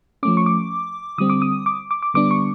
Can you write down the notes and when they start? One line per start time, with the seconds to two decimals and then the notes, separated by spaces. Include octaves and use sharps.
0.23 F3 A3 C#4 D6
0.37 C#6
0.46 D6
1.18 D3 G3 C4 D#6
1.30 D6
1.42 D#6
1.66 D6
1.91 D6
2.02 D6
2.14 D3 G3 B3 D4 D6
2.31 C#6